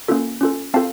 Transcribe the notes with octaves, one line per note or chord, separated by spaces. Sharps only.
A#3 C#4 F4 A4
C#4 F4 A4
C4 F4 A4 F5 A5